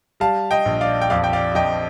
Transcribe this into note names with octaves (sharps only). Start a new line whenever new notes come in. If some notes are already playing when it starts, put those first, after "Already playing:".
G3 F5 A5
D#5 G5
A#1
D5 F5
G5
F2 D5 F5
G5
D5 F5
F2 D#5 G5